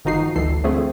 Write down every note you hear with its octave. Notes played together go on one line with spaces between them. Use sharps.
G1 D#3 F3 D#4 F#4 C7
G1 D2 E3 A4 C7
D3 F3 A3 C4 G#4